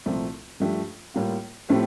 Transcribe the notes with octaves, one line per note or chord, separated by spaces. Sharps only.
C2 A#2 F3 A3 C4
G2 F3 A3 D4 G4
A2 G3 A#3 F4
A2 F3 A3 C4 G4